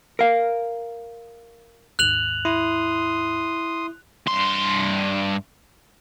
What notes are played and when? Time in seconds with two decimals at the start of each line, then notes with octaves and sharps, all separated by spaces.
0.19 A#4 F5
1.99 D#2 G#2 F#6 F7 F#7
2.45 E4 C6 D#6
4.27 G2 C6